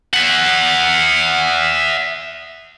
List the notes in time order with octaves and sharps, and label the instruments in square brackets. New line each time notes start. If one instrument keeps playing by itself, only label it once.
[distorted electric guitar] E5 F#5